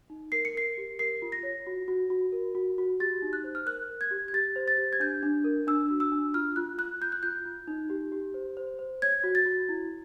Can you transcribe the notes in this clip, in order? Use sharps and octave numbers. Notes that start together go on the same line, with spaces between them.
D#4
A#4 C7
C#7
A#4 C7
G4
A#4 C7
F4
A#6
C#5
F#4
F#4
F#4
A#4
F#4
F#4
G4 A6
D#4
F#6
C5
F6
A#4 F#6
A#4
G#6
G4
G#6
G4 A6
C5
A6
G4
G#6
D4 G6
D4
A#4
D4 E6
F#4
E6
D4
F4 F6
F4 F#6
F4 F#6
F4 G6
F#6
F4 G6
F4
D#4
G4
G4
C5
C5
C5
C#5 G#6
F#4
A6
F#4
E4